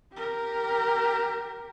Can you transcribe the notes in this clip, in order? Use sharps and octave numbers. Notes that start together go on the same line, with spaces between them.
G4 A#4